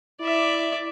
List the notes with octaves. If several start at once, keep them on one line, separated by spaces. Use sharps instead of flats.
E4 D5 E5